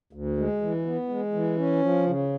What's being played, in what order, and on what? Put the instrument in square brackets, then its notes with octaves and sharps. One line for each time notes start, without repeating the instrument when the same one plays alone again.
[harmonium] D2
G#3
E3
B3
G#3
E3
C#4
F3
C#3